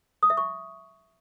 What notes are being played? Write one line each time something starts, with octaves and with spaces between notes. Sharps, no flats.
D#6
E5
C#6